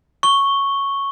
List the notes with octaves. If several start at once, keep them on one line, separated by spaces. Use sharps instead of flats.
C#6 G7